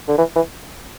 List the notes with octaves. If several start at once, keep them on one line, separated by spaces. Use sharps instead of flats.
D3
E3
E3